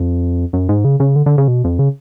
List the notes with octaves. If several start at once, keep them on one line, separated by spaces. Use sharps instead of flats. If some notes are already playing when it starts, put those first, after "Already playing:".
Already playing: F2
F#2
G#2
C#3
C#3
D3
D3
C#3
B2
F2
C#3